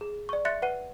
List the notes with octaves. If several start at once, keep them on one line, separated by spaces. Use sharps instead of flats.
G#4
D5 C#6
E5 C6 F#6 A6 C#7
B4 F#5 F#6 C7 D#7